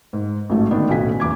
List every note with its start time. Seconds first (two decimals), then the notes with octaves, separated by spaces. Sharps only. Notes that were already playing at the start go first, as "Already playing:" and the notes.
0.13 G#2
0.50 A1 G#2 F#3 A3
0.71 D3 D#3 A#3 B3 D4
0.88 F#1 B1 A2 F#4 G#5 B6
1.20 E2 E3 D6 G#6